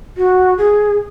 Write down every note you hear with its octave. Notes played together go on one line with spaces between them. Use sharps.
F#4
G#4